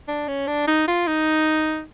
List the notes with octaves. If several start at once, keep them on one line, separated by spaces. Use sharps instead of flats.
D4
C#4
D4
D#4
F4
D#4